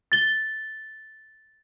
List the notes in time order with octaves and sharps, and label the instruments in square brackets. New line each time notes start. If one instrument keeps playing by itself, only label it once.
[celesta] A6 G7